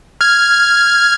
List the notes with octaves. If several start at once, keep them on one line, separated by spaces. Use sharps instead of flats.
F6 G#6